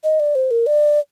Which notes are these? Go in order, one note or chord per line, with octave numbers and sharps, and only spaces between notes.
D#5
D5
C5
A#4
D5